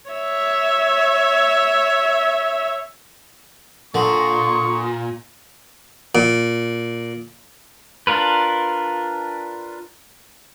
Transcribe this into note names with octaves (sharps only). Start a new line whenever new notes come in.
C#5 E5
A#2 D3 C6 C#6 D#6
A#2
D4 F4 A#4 B4